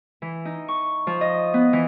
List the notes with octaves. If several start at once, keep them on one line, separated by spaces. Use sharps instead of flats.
E3
D#4
C#6
F3
D#5
B3
E3